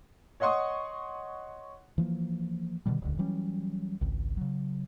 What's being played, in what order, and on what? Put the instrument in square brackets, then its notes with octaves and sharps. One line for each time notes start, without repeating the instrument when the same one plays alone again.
[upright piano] C#5 D#5 F#5 C6 C#6 D#6
[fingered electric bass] E3 F3 A#3
B2 D3 D#3 G3
D#1 C#2 D3
E3 F#3 G3 C#4
G#1 C#2
C#3 F#3